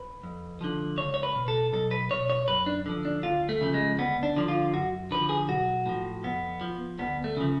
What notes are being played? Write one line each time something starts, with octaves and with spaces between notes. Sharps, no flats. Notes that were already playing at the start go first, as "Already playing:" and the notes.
Already playing: B4
F2
D3 F3
C#2 C#5
C#5
B4
B2
A4
B1 A4
B4
B2 C#5
C#5
F#2 B4
D4
D3 F3
D4
D2 F4
A3
C#3 F3
G#3
D2 B3
D4
D3 F3
F4
F#2 F#4
D3 F3 B4
G#4
B1 F#4
A2 F3
F2 B3
F3
D2 B3
A3
C#3 F3